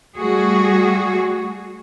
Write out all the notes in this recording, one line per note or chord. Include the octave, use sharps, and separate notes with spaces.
G3 A3 F#4 G#4